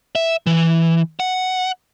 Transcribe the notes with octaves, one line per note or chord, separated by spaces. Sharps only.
E5
E3
F#5